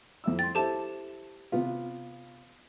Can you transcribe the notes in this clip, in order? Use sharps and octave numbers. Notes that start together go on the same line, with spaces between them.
F2 E4 E6
G5 C6 A6
E4 G4 A4 C5 A5
C3 B3 F4